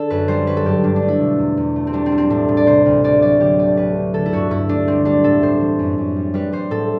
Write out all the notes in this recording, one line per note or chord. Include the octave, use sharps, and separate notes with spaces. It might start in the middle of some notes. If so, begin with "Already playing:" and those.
Already playing: D3 A4
F#2 B4
G3 C5
F#3 B4
A4
G2 G4
G2 D4
D4
A3
E4
B2
E2
E2
A3
C4
G3 D4
C4
G3
C4
A2 D4
A2
D5
C3 C5
D2
D2 D5
F#3 D5
D3 G4
A3 D5
D2 B4
F#3
D3 A4
E4
G2 F#4
G2 E4
A3 D4
G3 C4
G3 D4
A2 A4
A2 C5
E3
F#2
F#2
G3
G3 B4
G3 C5
A2 A4